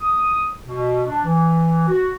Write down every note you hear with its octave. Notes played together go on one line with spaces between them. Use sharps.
D#6
B2
D4
E3
F#4